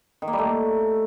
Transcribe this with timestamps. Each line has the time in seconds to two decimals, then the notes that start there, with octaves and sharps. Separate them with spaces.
0.22 D#3
0.28 A#3
0.33 G3
0.38 A3